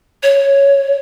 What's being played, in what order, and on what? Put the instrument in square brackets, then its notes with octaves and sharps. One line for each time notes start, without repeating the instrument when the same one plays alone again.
[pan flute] C#5